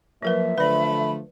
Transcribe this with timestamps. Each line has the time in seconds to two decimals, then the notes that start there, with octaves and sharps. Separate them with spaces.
0.23 F3 F#3 A#3 A#4 B4 E5
0.58 D3 F3 A3 B4 D5 B5